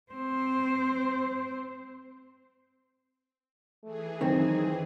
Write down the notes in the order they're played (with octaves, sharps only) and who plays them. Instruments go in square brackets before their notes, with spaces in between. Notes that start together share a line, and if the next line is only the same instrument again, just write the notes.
[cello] C4 C5
[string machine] E3 G#4 [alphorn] A3
[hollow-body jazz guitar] F#2 D#3 [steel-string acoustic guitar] C4 [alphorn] D#4